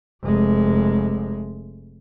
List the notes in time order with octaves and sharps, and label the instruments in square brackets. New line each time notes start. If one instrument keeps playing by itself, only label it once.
[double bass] F1 G#3